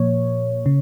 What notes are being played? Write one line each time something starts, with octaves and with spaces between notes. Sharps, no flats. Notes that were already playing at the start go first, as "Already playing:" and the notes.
Already playing: A#2 F3 A#3 C#5
C#3